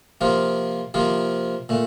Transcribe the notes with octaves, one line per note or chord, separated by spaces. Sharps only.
C3 F3 A#3 F4
C3 F3 A#3 F4
A#2 A3